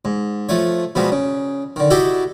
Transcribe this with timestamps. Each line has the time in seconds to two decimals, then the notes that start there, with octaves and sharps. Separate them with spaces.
0.05 G#2
0.49 F3 A3 C#5
0.95 B2 F3 G3 G#3 B3
1.12 C#3
1.76 D3 D#3
1.90 E4 F#4 G4 A4 D#5 E5